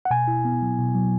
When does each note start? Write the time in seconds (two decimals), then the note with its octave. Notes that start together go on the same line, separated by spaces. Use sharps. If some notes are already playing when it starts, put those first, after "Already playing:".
0.05 F#5
0.11 B2 G#5
0.28 E4
0.45 B3
0.62 F#3
0.78 B2
0.95 F#3